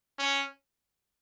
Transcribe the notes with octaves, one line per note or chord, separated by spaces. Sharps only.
C#4